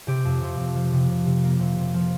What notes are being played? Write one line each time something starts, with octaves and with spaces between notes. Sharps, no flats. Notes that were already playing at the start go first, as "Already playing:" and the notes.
C3 G4
F2
C3
F2
F3
C3
C3
C3
A#3
C3
C3
F3